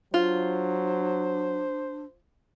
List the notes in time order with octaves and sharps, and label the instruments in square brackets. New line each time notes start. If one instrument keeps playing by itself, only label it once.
[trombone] F#3 [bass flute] D4 [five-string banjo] F4 [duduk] C5